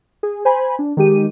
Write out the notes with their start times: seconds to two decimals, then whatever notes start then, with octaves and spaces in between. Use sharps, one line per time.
0.23 G#4
0.45 C5 G#5 B5
0.79 D4
0.97 D#3 G#3 G4 D#7